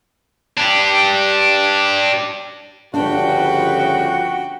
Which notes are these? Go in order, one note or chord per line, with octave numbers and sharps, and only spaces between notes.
D4 G4
G1 C#3 F3 D4 F#4 B4 G5